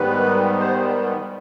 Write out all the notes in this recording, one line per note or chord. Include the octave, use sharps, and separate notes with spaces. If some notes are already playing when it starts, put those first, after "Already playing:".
Already playing: G#2 D#3 G3 B3 B4
C5